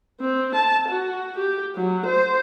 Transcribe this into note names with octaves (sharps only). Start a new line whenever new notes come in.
C4
A5
F#4
G4
F#3
C5